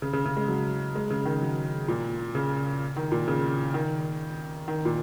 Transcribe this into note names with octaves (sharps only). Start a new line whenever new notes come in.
C#3
C#3
C#3
G#3
F#3
G#3
C#3
D#3
F#3
A#2
C#3
D#3
A#2
C#3
D#3
D#3
A#2